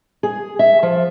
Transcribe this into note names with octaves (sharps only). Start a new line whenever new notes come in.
G#4
E5
F3